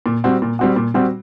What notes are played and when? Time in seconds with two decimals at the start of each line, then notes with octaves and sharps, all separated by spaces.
0.06 A#2
0.24 G3 C4 F#4
0.42 A#2
0.59 G3 C4 F#4
0.76 A#2
0.94 G3 C4 F#4